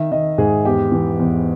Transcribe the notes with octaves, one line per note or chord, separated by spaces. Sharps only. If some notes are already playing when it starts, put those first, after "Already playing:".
Already playing: D#3 E5
D#3 D#5
G#2 G#4
E2 G4
E3
E2